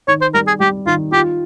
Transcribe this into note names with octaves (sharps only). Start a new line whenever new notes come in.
D#3 C#5
C5
G3 A#4
G#4
G3 G4
D#3 F4
F4 G4